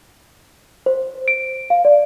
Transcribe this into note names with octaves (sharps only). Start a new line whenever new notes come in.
C5
D7
F5
D5